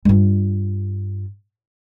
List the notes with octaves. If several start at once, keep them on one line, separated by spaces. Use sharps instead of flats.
G2 F4